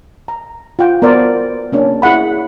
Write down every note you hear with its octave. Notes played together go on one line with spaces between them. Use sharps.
A#5
F4 F#5 G5
B3 A#4 C5 D5
A#3 C#4 D4
E4 G#4 F#5 B5